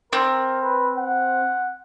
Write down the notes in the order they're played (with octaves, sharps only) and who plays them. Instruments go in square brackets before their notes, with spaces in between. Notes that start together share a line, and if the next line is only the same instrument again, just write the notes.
[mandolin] C4 [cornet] A#4
[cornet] B4
F#5